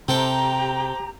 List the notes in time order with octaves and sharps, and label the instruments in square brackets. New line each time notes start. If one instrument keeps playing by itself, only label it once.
[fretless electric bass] C3 [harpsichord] C4 A4 G5 [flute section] G4 A#5